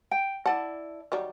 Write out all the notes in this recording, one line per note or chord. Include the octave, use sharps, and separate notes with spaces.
G5
E4 D5 F#5 A5
D#3 F#3 G3